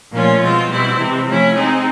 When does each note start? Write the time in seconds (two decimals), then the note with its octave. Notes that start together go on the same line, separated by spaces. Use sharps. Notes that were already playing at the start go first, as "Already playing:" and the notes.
0.12 A#2 F3 A3 C#4 F4
0.42 B2 G#3 C4 F4
0.69 B2 G3 C4 E4
0.98 C3 E3 G#3 C4
1.26 F3 A3 C#4 E4
1.54 G#3 C4 D#4 G#4